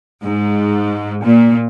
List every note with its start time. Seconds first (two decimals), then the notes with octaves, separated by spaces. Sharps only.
0.23 G#2
1.24 A#2